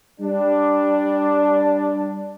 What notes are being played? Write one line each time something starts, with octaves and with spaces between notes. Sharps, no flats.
G3 D4